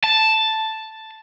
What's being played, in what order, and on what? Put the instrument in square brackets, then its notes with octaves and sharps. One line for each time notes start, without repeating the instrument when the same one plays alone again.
[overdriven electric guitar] A5